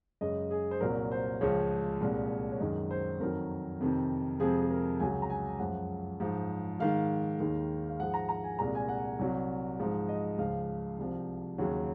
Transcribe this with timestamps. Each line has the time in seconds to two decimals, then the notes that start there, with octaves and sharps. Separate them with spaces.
0.21 F#2 C#3 G#3 D#5
0.51 G#4
0.71 C5
0.80 C2 A#2 F#3 A#4
1.11 C5
1.41 C#2 C#3 F3 G#3 C#5
2.01 C2 A#2 G#3
2.52 C#5
2.60 F#2 D#3 G#3 D#5
2.91 C5
3.20 F2 D#3 F#3 A#4
3.80 F2 C3 D#3
4.40 F2 C3 F3 G#3 G#4
4.62 G#4
4.71 A#4
5.00 C#2 C#3 F#3 G#5
5.22 A#5
5.30 G#5
5.59 F#2 F3 G#3 F#5
6.20 G#2 F3 G#3
6.79 G#2 D#3 G#3 F5
7.40 D#2 D#3 G#3
7.89 F5
7.99 G#2 F3 G#3 F#5
8.14 A#5
8.29 A#5
8.44 G#5
8.59 C2 A#2 G#3 A#5
8.75 G#5
8.89 F#5
9.19 C2 C3 F#3
9.80 G#2 F3 G#3
10.09 D#5
10.38 C#2 C#3 F3 F5
10.98 C2 C3 F3
11.58 D#2 C#3 F#3